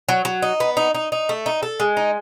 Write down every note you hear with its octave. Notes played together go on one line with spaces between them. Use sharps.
F#3
F#3
D#4
B3
D#4
D#4
D#4
A3
D#4
A4
G#3
D#4